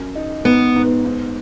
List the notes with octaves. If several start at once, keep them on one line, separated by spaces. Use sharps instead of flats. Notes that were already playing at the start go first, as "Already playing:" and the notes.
Already playing: F#2
D#4
G#2 B3
G#2
G#2